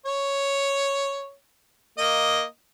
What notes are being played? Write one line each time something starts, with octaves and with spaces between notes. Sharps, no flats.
C#5
A#3 D#5